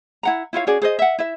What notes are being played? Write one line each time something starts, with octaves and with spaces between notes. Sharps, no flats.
E4 F#5 A#5
E4 F4 C#5 F5
C#4 F#4 G#4 D5
G#4 C5 D#5
E5 F#5
E4 E5